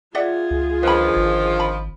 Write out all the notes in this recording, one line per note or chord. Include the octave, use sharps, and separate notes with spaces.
F4 G#4 D5 E5 F#5
C#2
D3 D#3 F3 B4 B5
G#1
B5